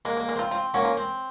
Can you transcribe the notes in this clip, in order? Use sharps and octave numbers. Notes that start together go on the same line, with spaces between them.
G#3 A#3
G#3
A#3
G#3
C4 F4
C4 F4
A#3 C#4 F#4
F4
C4